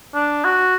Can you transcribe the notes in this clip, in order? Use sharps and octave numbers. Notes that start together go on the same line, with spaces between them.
D4
F#4